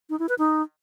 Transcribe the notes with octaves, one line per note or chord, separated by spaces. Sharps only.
D#4
E4
B4
D#4